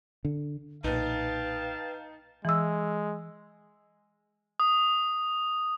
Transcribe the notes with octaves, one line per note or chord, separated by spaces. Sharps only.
D3
B1 A#2 D#4 B4 F5 G5 A5
E3 G#3 E6
D#6